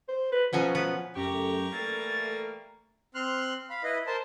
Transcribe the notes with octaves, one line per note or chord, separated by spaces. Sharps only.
C5
B4
B2 F3 F#3 C#4
B3
F#2 C#3 A3 G4 A#5 C#6
E3 G3 A3 A#3 A6
C4 C6 F6 F#6
F5 B5
E4 B4 D#5
A#4 C5 A5